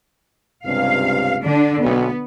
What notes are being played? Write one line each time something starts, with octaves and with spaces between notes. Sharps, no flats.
C#2 G2 C3 F5
D3 D4
B1 B3